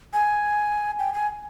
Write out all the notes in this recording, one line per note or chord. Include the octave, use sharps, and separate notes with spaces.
G#5
G5
G#5